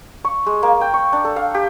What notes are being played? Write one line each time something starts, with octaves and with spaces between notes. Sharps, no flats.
C#6
G#3
A#3
G5
C#6
D4
A4
F5
G4